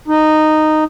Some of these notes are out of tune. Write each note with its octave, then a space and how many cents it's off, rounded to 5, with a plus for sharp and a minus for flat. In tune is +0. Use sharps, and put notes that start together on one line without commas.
D#4 -10